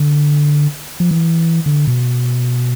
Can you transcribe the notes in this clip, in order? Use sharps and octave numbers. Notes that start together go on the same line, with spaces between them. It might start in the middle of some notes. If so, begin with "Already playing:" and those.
Already playing: D3
F3
E3
D3
B2